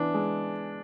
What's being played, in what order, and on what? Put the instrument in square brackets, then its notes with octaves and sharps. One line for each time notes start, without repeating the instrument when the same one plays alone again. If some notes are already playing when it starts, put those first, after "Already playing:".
Already playing: [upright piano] E3 B3 [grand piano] D4
[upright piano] G#3